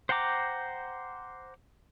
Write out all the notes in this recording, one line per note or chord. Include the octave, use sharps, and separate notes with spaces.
C5 F#5 G5 A#5 D6